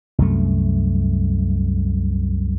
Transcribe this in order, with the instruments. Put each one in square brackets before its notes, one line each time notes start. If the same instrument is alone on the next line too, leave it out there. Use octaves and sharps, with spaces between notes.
[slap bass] C2 F#2 A3